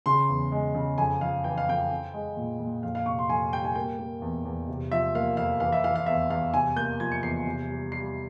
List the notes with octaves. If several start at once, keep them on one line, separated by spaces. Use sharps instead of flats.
C#3 C6
E2
G#3
C#3
F2 G#5
F2 F5
E3 G5
F5
F2 G5
C4
G#3
A#2
A#2
F2 F5
F5
C3 C#6
C6
F2 G#5
G3 G5
G#5
A#3 G5
A#3
E2
E2
C3
F3 E5
A#3 F5
F2 F5
E3 F5
E5
E3 F5
F5
E2 E5
E2 F5
C3 G#5
A#3 G6
F3 G#6
C#7
E2 C7
C3
G3
G3 C7